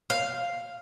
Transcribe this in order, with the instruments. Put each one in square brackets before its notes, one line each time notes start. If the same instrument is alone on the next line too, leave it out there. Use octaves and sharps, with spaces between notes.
[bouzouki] F5